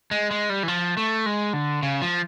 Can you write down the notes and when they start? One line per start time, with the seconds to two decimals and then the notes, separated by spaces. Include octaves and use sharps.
0.11 G#3
0.31 G#3
0.50 G3
0.63 E3
0.68 F3
0.97 A3
1.26 G#3
1.53 D3
1.83 C#3
2.02 F3